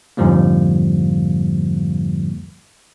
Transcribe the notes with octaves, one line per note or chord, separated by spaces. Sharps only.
F2 G#2 D3 F3 G3 A#3